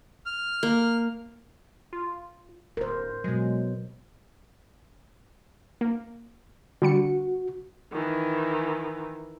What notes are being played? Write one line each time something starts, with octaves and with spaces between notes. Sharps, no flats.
F6
A#3
F4
D1 A#4 C5
B2 F#3 G#3
A#3
D3 G3 F#4 C#7
D#3 E3